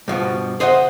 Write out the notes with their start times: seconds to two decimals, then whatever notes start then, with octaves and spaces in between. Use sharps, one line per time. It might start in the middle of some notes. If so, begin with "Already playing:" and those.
0.08 G2 B2 D#3 F3
0.60 G#4 C5 D#5 E5 F#5